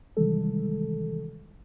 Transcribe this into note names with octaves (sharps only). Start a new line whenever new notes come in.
C3 D#3 E3 G3 G#3 A4